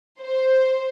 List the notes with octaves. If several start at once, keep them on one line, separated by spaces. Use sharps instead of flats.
C5